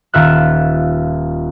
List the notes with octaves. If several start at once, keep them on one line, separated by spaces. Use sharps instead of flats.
D#1 F4 E5 F#6